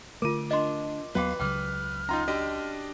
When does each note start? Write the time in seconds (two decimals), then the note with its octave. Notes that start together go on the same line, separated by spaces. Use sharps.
0.22 D3 A3 F4 A#4 D6 D#7
0.51 D4 D#5 C6
1.15 D#2 F#3 B3 F#4 B4 F5 G5 D6
1.39 C#2 C#3 F#3 G5 D6 F6
2.09 C#4 D#4 F4 A#5 C6
2.28 D4 F#4 G4 D#5